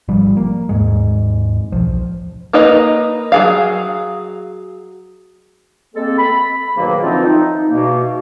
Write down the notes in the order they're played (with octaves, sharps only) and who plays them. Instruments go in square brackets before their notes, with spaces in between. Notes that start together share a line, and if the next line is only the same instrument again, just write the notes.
[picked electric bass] G#1 F3 G3
A#3
D#2 G#2 G#3
B1 F3
[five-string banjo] A#3 D#4 A#4 B4 D#5
F#3 G#4 F5
[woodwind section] G#3 A#3 C4 A4
B5
G#2 B2 D#3 F#3 A#3
D3 E3 F3 C4 D#4 F4
D#4
E2 B2 A#3